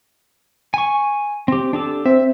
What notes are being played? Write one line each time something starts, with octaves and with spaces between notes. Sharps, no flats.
G#5 C#6
C4 G4
D4 G4 A4
C4 E5